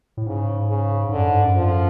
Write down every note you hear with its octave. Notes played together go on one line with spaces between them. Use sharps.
A2
G#2 C#3
C#3
G#2
F#2 D3
G#2
F#2
F3